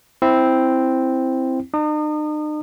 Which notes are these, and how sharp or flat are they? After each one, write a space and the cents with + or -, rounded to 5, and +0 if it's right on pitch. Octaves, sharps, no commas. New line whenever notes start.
C4 +0 E4 +0
D#4 -45 D#6 -35